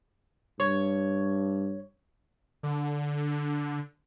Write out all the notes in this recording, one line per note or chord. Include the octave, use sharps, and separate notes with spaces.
G2 C#5
D3